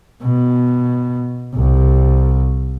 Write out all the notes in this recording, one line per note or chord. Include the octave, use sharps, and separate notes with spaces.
B2
C2